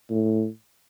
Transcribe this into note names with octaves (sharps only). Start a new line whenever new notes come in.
A2